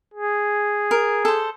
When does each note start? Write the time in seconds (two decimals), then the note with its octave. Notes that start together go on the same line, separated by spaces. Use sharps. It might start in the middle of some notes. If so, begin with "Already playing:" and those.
0.14 G#4
0.91 A#4
1.25 A4 C5